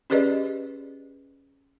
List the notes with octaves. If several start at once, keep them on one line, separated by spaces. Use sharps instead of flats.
C#4 G4 G#4 B4 D5 D#5